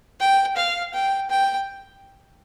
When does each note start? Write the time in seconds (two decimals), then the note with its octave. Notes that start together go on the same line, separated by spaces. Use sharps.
0.20 G5
0.57 F5
0.94 G5
1.30 G5